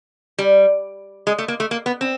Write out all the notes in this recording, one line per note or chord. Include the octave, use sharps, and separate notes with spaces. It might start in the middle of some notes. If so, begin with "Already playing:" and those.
G3
G#3
A3
A#3
A3
A#3
B3
C4